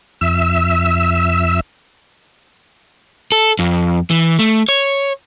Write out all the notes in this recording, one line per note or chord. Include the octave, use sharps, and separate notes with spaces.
F2 E5 E6
A4
F2
E3
A3
C#5